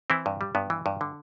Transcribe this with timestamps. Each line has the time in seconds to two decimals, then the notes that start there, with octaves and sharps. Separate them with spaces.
0.10 E3 C4 E4
0.26 G2
0.41 G3
0.55 G2 B3
0.70 E3
0.86 G2
1.01 D3